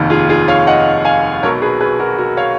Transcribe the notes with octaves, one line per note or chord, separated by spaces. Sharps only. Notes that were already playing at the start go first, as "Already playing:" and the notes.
Already playing: F1 D#2 D#3
F4 G#4
F4 G#4
C#5 F5
D#5 F#5
F5 G#5
B1 B2 F#3 A#4 C#5
G#4 B4
G#4 B4
F#4 A#4
F#4 A#4
C#5 F5